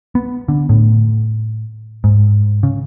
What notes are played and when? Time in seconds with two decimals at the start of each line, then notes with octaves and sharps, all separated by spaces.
0.15 B3
0.48 D3
0.69 A2
2.04 G#2
2.63 C#3